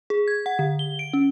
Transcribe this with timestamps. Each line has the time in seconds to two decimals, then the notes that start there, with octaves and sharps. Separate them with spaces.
0.10 G#4
0.28 G#6
0.46 F#5
0.59 D3
0.79 G7
0.99 D7
1.13 C#4